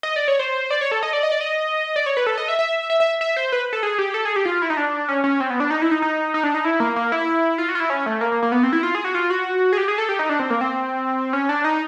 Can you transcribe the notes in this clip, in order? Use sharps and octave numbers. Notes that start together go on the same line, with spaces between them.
D#5
D5
C#5
C5
D5
C#5
A4
D#5
D5
D#5
D5
D#5
D5
C#5
B4
A4
D#5
E5
E5
E5
E5
E5
C5
B4
A4
G#4
G4
A4
G#4
G4
F4
E4
D#4
D4
C#4
C#4
C4
B3
D4
D#4
E4
D#4
D#4
D#4
D4
D#4
E4
A#3
A#3
E4
F4
F#4
F4
E4
C#4
A3
A#3
A#3
A#3
B3
C4
E4
F4
G#4
F#4
F4
F#4
G#4
G4
G#4
A4
G4
D#4
D4
C4
A#3
C4
C#4
D4
D#4